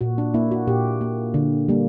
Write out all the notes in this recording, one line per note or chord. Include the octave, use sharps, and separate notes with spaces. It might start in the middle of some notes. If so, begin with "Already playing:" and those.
A#2 F#4
D4
A#3 E4
F#4
A#2 G4
A#3
D3
G3 A#3